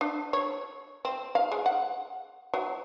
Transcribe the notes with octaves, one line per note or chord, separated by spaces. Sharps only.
D4
C#5
C4
F5
G#3
F#5
F#3